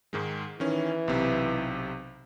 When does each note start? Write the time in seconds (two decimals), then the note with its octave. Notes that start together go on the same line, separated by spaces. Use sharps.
0.13 G#2 D#3 G#3
0.60 D#3 E3 C#4
1.08 B1 C3